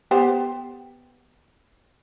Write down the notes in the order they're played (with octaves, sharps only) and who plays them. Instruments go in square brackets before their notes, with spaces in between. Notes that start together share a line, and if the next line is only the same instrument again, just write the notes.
[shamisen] B3 G4 C5